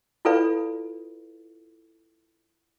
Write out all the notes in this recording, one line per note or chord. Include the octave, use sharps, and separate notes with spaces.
E4 F4 A4 B4 D5 F5